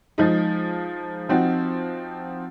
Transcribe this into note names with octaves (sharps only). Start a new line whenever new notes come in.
F3 G#3 D#4
F3 C4 D#4 F#4